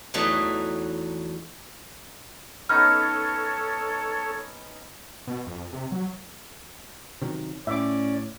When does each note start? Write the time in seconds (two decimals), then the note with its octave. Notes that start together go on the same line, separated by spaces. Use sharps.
0.14 E2 E3 F#3 A3 D#4
2.69 B3 C#4 D#4 A4 C#5 F6
5.27 B2
5.47 F2
5.73 C3
5.92 F#3
7.22 C3 D#3 F#3
7.67 A2 C#4 D5 E5 D6